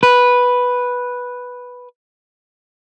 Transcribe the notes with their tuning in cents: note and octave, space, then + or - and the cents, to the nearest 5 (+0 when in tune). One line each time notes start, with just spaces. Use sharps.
B4 -5